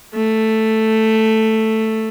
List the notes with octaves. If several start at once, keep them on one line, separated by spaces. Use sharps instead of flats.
A3